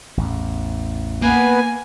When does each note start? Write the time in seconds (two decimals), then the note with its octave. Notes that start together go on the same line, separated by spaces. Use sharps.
0.17 A1 E2
1.22 A#3 B3 B4 G#5